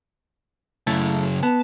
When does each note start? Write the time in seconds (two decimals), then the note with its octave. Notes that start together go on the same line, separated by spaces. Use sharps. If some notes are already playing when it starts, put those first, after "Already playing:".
0.87 F#2 C#3 A3 E4 A4
1.43 B3 A5